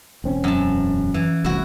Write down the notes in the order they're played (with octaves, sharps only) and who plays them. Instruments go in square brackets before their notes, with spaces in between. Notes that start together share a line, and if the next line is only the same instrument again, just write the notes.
[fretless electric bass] E1 C4 C#4
[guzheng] F#2 A5
E3
[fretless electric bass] F1 C2 F2 [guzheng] E4 F#4